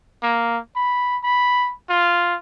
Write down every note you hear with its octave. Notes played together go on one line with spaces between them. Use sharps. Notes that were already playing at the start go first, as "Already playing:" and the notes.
A#3
B5
B5
F4